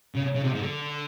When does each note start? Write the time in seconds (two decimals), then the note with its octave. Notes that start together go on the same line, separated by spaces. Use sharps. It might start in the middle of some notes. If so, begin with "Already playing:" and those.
0.16 C#3
0.35 C#3
0.44 C3
0.54 G#2
0.62 D3